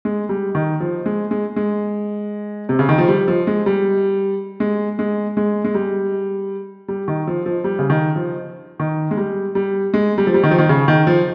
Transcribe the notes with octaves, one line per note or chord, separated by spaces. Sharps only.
G#3
G3
D#3
F3
G#3
G#3
G#3
C3
C#3
D#3
F3
G3
F3
G#3
G3
G#3
G#3
G#3
G#3
G3
G3
D#3
F3
F3
G3
C#3
D#3
F3
D#3
G#3
G3
G3
G#3
G3
F3
G3
D#3
F3
D#3
C#3
D#3
F3